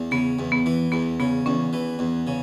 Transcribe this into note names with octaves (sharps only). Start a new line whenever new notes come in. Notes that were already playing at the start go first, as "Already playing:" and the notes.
Already playing: E2
C#3 B3
E2
B3
E3
E2 B3
C#3 B3
E2 C#4
E3
E2
C#3